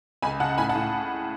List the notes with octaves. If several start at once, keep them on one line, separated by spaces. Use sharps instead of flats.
C#2 G#5 B5
C#3 F#5 A5
A2 G#5 B5
F#5 A5
A2